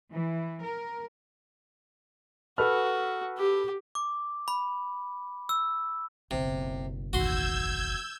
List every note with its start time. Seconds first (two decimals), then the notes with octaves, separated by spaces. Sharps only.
0.11 E3
0.62 A#4
2.58 F#4 A4 B4 F6
3.38 G4
3.95 D6
4.48 B5
5.49 E6
6.31 F#1 B1 C3
7.13 A1 D#2 F#4 C6 E6 G6 G#6